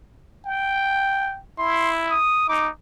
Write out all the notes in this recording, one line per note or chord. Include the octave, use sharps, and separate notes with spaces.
G5
E4 C6
D#6
D#4 D6